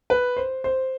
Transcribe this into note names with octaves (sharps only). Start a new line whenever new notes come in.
B4
C5
C5